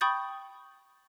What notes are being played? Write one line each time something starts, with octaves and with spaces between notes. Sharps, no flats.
G5 B5 C#6 D#6 G6 A6